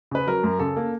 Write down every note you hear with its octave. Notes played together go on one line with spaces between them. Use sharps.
C#3 B4
F#3 A#4
F#2
C#3 A4
A#3